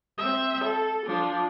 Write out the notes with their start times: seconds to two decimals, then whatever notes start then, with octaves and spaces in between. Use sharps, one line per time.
0.18 C4 E5
0.65 A4
1.06 F3 D4